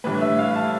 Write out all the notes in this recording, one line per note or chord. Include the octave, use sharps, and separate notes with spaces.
A2 E3 G3 D4 B4
E5
F5
A5